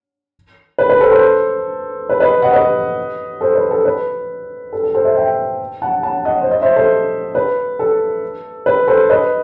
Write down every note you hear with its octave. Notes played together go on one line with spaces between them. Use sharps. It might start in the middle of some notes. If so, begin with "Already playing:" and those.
B4
B4
A4 C5
A4 C5
B4
B4 D#5
D#5 F#5
B4 D#5
A4 C5
B4
A4
B4
A4
A4
A4 C5
C5 E5
E5 G5
F#5 A5
F#5 A5
D#5 F#5
C5
D#5
C5 E5
A4 C5
B4
A4
B4
A4 C5
B4 D#5